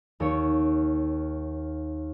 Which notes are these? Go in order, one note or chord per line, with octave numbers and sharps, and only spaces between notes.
D#2 C#5